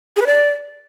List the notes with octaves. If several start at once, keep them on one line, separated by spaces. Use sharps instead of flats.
G#4
B4
D5